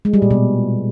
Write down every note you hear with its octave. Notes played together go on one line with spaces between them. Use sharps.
G#3
G3
A#2
B2